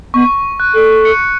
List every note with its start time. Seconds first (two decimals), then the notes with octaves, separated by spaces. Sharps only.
0.14 B3 C#6
0.60 F#6
0.75 A4
1.05 C#7